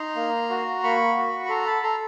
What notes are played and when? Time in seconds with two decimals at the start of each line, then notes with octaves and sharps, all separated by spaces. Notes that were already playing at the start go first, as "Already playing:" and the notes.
Already playing: D#4 A#5 C6
0.16 A#3
0.50 F#4
0.83 A#3 B5 C#6
1.17 F#4
1.45 B5
1.49 A4 A#5 C6
1.66 A5 B5
1.83 A4 A#5 C6